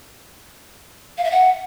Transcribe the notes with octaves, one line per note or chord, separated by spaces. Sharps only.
F5
E5
F#5